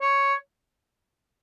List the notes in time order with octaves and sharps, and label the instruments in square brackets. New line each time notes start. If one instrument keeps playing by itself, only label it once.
[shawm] C#5